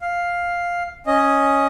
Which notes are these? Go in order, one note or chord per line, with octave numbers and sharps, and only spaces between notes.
F5
C#4 D#5